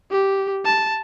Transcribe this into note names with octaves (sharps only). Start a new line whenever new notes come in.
G4
A5